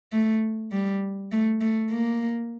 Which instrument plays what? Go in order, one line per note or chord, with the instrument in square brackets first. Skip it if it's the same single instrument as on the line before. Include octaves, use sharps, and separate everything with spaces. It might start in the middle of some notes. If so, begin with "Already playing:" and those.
[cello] A3
G3
A3
A3
A#3